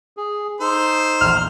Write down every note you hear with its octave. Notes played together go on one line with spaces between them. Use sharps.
G#4
D#4 A4 C5
A#1 E2 F6